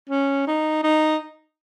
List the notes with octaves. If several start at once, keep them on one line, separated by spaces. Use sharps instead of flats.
C#4
D#4
D#4